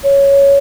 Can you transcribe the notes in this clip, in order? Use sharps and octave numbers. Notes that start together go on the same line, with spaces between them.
C#5